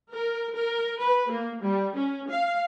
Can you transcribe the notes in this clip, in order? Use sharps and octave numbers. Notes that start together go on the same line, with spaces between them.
A#4
A#4
B4
A#3
G3
C#4
F5